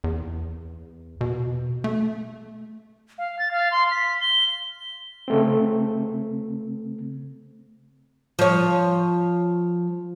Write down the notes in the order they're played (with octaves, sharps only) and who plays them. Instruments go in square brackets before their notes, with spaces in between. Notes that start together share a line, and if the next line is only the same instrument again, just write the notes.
[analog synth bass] E2
B2
A3
[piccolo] F5
A6
F5
C6
B6
G7
[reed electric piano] C#3 A3 C4
[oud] F3 C#5